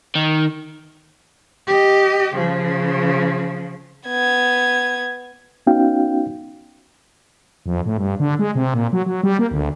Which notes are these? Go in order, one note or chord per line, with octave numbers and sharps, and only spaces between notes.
D#3
G4 D#5
C#3 F3
B3 G#6
B3 C#4 D#4 F#4 F5 G5
F2
A2
G2
D3
G#3
C3
A#2
F#3
F#3
G3
A#3
D2